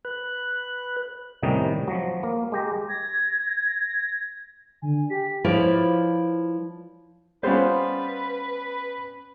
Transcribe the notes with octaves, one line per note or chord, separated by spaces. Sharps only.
B4 F#6
A2 C3 D#3 G3 C#4 D#4
F3 F#3
A#3
G#3 G4 A#5
G#6 A#6
D3 G#5
G4 B6
F3 E4 F4 B4 C#5 D5
G3 B3 C#4 F4 B4 C5